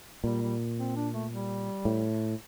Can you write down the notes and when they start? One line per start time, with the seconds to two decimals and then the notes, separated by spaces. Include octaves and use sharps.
0.24 A#2 G3
0.42 G3
0.79 C4
0.96 D4
1.13 A3
1.31 G3
1.85 A2